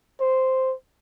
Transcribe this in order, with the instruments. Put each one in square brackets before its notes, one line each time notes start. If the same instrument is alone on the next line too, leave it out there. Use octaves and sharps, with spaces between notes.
[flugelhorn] C5